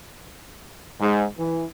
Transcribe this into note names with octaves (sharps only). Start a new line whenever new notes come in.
G#2
E3